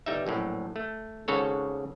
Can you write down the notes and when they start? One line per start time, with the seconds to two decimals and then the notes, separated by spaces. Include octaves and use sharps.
0.06 G1 G3 D#4 E5
0.26 A#1 F#2 A2
0.76 A3
1.28 G#1 G#2 C#3 A4 C#5